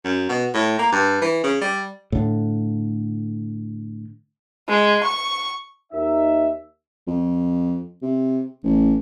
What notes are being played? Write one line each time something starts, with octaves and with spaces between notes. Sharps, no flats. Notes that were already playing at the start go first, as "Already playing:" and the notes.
F#2
B2
A2
A#3
G2
E3
C#3
G3
A2 D3
G#3
C#6
D#2 D#4 E5
F2
C3
A1